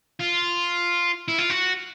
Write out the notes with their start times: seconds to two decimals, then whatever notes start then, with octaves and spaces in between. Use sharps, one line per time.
0.20 F4
1.28 E4
1.38 F4
1.50 F#4